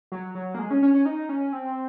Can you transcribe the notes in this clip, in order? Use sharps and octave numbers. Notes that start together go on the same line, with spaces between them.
F#3
F#3
A#3
G#3
C#4
C#4
C#4
D#4
C#4
C4